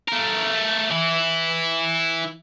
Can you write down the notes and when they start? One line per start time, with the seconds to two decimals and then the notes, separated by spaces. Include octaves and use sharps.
0.08 A3 A#4
0.91 E3 E4